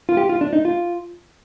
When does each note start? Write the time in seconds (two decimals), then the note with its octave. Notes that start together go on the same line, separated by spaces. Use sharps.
0.09 F4
0.17 G4
0.29 F4
0.41 D4
0.53 D#4
0.65 F4